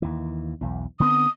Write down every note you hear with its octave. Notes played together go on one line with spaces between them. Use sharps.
D#2 E3
B1 E2
D3 B3 C4 D#6